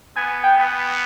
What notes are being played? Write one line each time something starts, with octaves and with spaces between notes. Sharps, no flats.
B3 G#5
G5
B3